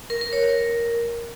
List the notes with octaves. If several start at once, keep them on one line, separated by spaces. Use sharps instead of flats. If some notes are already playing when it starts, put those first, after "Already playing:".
A#4
A#4
C#5
A#4